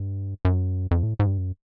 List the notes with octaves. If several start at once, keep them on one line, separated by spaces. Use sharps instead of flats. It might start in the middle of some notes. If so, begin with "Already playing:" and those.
Already playing: G2
F#2
F2
A2
G#2
G2
F#2